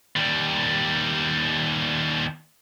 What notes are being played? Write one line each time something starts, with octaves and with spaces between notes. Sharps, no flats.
D#2 G3